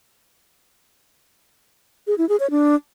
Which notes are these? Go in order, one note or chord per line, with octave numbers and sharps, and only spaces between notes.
G#4
E4
G#4
C#5
D4